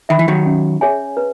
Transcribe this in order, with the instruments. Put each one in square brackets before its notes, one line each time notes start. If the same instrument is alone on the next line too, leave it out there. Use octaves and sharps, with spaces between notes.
[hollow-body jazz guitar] D#3 [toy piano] E5 B5
[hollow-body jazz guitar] E3
D#3 F#3
[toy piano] C#4
G#4 C#5 E5 G#5
B4